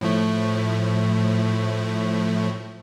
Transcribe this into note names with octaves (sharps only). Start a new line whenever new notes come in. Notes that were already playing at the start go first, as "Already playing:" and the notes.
A2 F3 A3